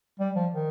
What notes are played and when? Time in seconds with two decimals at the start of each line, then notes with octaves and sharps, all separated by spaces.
0.19 G3
0.35 F3
0.51 D#3